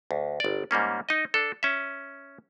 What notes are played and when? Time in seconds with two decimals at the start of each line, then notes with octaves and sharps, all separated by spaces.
0.11 D2
0.40 G1 D5
0.71 G#2 G3 A#3 C#4
1.09 D#4 D#5
1.34 D4 A4
1.63 C#4 E5